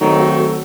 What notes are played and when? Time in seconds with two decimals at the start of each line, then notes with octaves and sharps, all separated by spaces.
0.01 D#3 F#3 A3 C4 D#4
0.20 F#4
0.39 A4